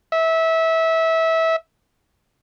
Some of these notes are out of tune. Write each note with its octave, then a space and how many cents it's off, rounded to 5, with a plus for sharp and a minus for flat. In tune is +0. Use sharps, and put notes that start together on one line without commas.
E5 -20